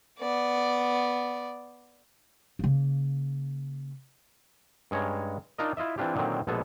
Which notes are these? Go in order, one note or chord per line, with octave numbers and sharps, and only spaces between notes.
B3 D5
C#3 A#3
G2 G#3 C#4 C#5 A#5
D4 D#4 F4 A#4 D#5
E4 F4 D#5 E5
E3 C4 D4 F4 G4
A#2 D3 D#3 F#3 C4
A#1 B2 G#3 B3 A4 G#5